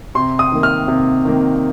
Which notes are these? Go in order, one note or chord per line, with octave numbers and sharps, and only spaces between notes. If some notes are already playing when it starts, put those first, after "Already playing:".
C3 C6
D#6
D#3 A#3
F6
C3
D#3 A#3